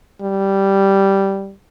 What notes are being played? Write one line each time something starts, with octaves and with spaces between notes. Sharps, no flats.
G3